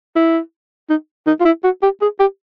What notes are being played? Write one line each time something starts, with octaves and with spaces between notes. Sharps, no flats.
E4
D#4
D#4
F4
E4
F#4
G4
G#4
G4